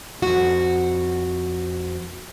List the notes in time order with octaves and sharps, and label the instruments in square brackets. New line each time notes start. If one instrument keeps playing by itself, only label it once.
[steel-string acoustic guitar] F2 F#4